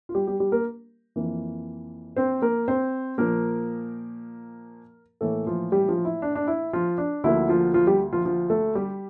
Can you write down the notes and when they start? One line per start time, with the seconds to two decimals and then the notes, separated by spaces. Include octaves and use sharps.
0.09 F4
0.14 G3 G4
0.27 G3 G4
0.40 G3 G4
0.52 A#3 A#4
1.16 F2 E3 A#3
2.16 C4 C5
2.42 A#3 A#4
2.68 C4 C5
3.18 A#2 F3 A#3 A#4
5.21 A2 E3 A3 A#3 A4
5.47 F3 F4
5.72 G3 G4
5.89 F3 F4
6.05 E4
6.22 D4
6.35 D4
6.47 E4
6.73 F3 F4
6.98 D4
7.24 D2 D3 F3 A#3 E4
7.49 F3 F4
7.74 F3 F4
7.87 G3 G4
8.12 F3 F4
8.25 F3 F4
8.50 A3 A4
8.75 G3 G4